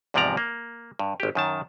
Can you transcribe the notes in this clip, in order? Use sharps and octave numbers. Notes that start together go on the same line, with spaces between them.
E2 G#2 C3 F3 D5 A#5
A#3
G2
G#1 G4
F#2 D#3 A5